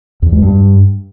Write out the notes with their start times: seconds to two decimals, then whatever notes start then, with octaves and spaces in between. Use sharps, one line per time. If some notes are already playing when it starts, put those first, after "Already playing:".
0.22 E2
0.32 G#3
0.43 G2